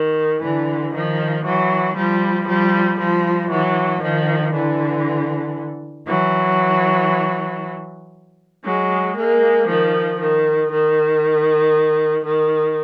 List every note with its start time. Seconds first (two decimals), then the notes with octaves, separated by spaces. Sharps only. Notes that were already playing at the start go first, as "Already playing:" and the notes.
Already playing: D#3
0.43 D3 E3
0.94 D#3 F3
1.45 E3 F#3
1.96 F3 G3
2.48 F3 G3
2.99 F3 G3
3.51 E3 F#3
4.02 D#3 F3
4.53 D3 E3
6.08 E3 F#3
8.65 F#3 G#3
9.16 G#3 A#3
9.67 D#3 F3
10.20 D#3
10.70 D#3
12.25 D#3